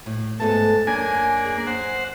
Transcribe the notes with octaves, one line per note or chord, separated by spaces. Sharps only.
A2
G#2 A3 B3 A5
F#2 A#3 D4 G#5
G#4
C5 F#5